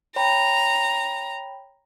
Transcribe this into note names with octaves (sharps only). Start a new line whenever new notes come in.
C#5 G5 A#5 B5